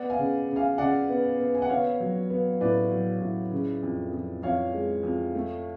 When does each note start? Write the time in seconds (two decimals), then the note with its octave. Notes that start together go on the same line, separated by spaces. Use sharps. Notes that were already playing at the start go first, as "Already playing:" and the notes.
Already playing: B3 D5 F#5
0.10 F5 G#5
0.19 C#3
0.49 C#3
0.56 F5 G#5
0.78 C#3 D5 F#5
1.09 B3
1.39 B3
1.55 G#5
1.62 F#5
1.69 B3 C#5 F5
2.00 F#3
2.30 B3
2.61 A2 B4 D5
2.91 F#3
3.21 A2
3.51 C#3
3.83 F2
4.12 F2
4.43 F2 C#5 F5
4.73 G#3
5.03 F2
5.35 A3